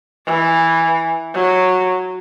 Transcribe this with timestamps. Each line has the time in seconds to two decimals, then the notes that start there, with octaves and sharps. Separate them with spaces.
0.27 E3
1.34 F#3